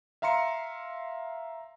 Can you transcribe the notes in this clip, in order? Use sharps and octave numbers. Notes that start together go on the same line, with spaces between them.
E5 F5 A#5 C6 C#7